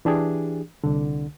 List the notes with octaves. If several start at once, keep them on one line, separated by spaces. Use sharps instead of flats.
E3 D4 G4 G#4
C2 D3